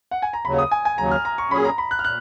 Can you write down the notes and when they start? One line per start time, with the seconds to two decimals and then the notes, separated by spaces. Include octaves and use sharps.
0.11 F#5
0.22 G#5
0.33 A#5
0.45 D#2 C#3 F#3 B5
0.59 D#6
0.71 G#5
0.85 G#5
0.98 D#2 C#3 F#3 A#5
1.12 F6
1.25 A#5
1.38 C#6
1.51 A#2 F#3 C#4 G#4 B5
1.65 A#5
1.78 B5
1.91 F#6
1.99 F6
2.05 A#2 F#6